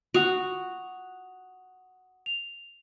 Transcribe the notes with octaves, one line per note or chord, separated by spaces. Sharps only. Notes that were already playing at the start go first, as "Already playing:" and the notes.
F#4 F#5 D#6 F7
F7